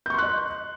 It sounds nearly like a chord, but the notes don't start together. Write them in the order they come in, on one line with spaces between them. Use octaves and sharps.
G6 C#6 C6 F#6 D#5